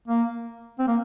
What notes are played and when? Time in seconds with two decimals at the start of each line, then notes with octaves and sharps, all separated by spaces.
0.08 A#3
0.79 C4
0.88 A#3